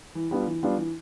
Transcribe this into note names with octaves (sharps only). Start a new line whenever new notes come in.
E3
G3 B3 D4 F4
E3
G3 B3 D4 F4
E3